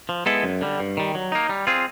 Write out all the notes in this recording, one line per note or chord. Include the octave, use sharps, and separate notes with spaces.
F3
G#3 B3 E4 A4
F#2
D3 G3
G2
D#3 G3
F#3
A#3 D#4
G3
C4 F4 G#4